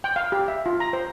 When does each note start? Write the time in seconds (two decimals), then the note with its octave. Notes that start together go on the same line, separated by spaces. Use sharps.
0.04 G5
0.16 F5
0.32 G4
0.48 E5
0.66 F4
0.80 A#5
0.93 C5